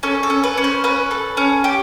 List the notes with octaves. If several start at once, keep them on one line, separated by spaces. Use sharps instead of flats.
C#4 A4
A4
C#4
B4
C#4
C5
C#4 B4
A4
C#4
G4